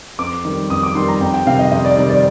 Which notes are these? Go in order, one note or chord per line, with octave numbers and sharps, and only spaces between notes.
F2 D6
D#3 G3
F2 D#6
D6
D#3 G3 C6
A#5
F2 G5
G5
C3 D#3 G3 F5
D#5
F2 D#5
D5
C3 D#3 G3 D5
D5